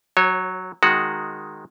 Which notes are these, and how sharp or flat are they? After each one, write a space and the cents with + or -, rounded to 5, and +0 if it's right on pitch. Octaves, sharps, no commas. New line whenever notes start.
F#3 +0 C#5 -30
D#3 -5 G#3 +0 F#4 +0